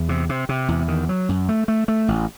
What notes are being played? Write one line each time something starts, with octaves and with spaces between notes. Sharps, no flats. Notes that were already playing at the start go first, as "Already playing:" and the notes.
Already playing: E2
C3
C3
C3
E2
D#3
F#3
F#2
A3
A3
A3
A1